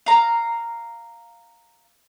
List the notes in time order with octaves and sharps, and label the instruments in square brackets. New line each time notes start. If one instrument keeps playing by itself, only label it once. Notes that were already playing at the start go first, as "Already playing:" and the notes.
[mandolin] F5 A#5